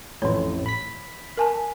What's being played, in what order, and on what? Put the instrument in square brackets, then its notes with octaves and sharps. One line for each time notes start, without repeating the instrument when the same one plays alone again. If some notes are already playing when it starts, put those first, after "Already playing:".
[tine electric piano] A1 F2 A2 [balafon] E3 C#5
[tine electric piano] B5 B6
[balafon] A#4 G#5 A5